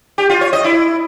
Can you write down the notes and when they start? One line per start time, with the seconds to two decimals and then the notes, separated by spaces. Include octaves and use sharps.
0.18 G4
0.30 F4
0.41 C#5
0.53 D#5
0.64 E4